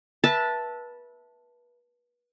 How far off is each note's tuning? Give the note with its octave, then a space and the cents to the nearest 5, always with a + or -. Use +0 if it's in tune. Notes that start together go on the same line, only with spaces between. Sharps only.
B4 -30 E5 +0 A5 +0